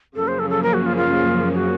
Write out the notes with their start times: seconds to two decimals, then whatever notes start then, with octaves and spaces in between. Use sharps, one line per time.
0.16 F#2 C#3 F3 A#3 A4
0.28 C5
0.39 A4
0.50 A4
0.63 A#4
0.74 F#4
0.86 F4
0.97 F4
1.54 F#4